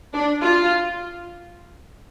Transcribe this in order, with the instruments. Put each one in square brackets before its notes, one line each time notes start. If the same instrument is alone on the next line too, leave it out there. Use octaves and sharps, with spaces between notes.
[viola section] D4
F4